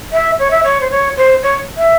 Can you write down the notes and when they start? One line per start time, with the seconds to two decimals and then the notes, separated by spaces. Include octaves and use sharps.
0.12 E5
0.38 C#5
0.50 E5
0.63 C#5
0.80 C5
0.90 C#5
1.16 C5
1.42 C#5
1.77 E5